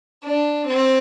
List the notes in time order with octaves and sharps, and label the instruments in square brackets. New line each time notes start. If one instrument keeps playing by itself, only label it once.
[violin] D4
C4